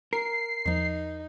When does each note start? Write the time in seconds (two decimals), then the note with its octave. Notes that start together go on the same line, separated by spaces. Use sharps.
0.13 A#4 C7
0.66 E2 F3 D#4